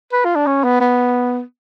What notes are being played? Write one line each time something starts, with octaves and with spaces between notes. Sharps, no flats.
B4
F4
D4
C#4
B3
B3